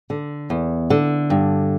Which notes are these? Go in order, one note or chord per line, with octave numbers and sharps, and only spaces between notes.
D3
E2
D3
G2